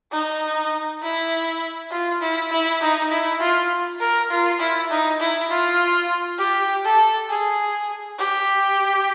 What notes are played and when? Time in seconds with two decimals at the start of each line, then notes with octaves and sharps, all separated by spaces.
0.12 D#4
1.02 E4
1.91 F4
2.21 E4
2.51 E4
2.81 D#4
3.11 E4
3.40 F4
4.00 A#4
4.30 F4
4.60 E4
4.90 D#4
5.20 E4
5.50 F4
6.39 G4
6.85 A4
7.29 G#4
8.19 G4